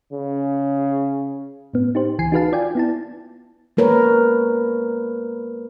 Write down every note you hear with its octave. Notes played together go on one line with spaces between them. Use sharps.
C#3
A2 B3
D#4 G4 C5
C#2 E3 G#5 C7
D#4 F#4 G#4 B4 F5 A5
F4 D5 G5 G#5
B3 E4 A5
G#3 A#3 A#4 B4 C#5